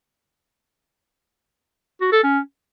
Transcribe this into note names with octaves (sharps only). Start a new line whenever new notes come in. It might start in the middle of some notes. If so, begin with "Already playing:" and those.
F#4
A4
C#4